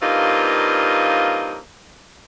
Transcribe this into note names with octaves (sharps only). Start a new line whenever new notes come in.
G2 A#3 C4 D#4 F4